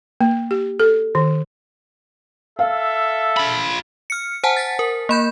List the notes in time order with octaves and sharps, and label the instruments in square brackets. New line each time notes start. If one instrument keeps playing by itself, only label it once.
[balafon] A#3
G4
A4
D#3
[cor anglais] A4 [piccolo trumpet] E5 [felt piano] F5
[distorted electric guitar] F4 B5
[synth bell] F6 C#7
C5 F#5 G#5 A5
A6 B6
A#4
A#3 B5 G6